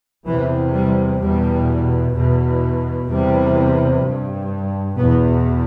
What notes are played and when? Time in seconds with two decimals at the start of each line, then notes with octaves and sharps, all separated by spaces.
0.26 E2 C3 E3
0.73 G3
1.20 E2 B2 G3
2.14 E2 B2
3.09 E2 C3 G3
4.03 G2
4.97 E2 B2 B3